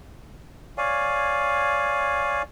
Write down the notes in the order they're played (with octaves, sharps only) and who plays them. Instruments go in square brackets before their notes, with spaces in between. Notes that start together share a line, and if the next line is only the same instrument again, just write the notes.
[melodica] C#5 D5 F5 G#5